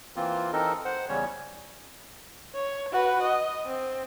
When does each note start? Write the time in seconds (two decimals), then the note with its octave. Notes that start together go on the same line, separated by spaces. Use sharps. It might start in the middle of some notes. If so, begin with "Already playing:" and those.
0.16 E3 A#3 C4 F4
0.53 E3 C4 D#4 A4 A#4 D#5
0.85 C5 F#5
1.09 E2 C#3 G3 C#4 C#5
2.55 C#5
2.92 F#4 B4
3.22 D#5
3.66 C4